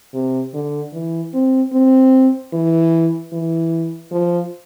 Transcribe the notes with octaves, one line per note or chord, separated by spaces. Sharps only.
C3
D3
E3
C4
C4
E3
E3
F3